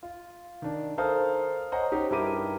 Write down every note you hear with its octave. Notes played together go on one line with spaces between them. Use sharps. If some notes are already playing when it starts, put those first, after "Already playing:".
F4
D#3 D4
A4 A#4 C5 F5 D#6 F6
C5 C#5 D#5 F#5 G#5 A#5
C#4 D#4 G4 C5
G2 E4 G4 A#4 D6 D#7